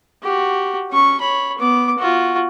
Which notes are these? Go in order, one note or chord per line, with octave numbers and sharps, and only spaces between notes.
F#4 G4
C#4 C#6
C#5 B5
B3 D6
F4 F#4